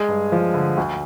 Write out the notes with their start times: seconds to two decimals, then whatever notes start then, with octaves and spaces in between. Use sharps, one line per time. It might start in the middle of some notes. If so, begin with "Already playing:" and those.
Already playing: G#3 G#4
0.08 G2
0.32 F3
0.54 D3
0.77 D2